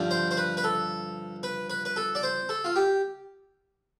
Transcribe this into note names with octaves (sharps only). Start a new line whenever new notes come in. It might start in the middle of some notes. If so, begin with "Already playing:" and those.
Already playing: G2 D3 F3
C5
C5
B4
B4
A4
B4
B4
B4
A4
D5
C5
A4
F4
G4